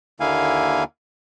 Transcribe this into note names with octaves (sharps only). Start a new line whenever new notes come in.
D#2 D3 A#3 E4 F5 G#5